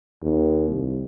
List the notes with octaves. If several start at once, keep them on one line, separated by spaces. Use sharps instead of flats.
D#2
C2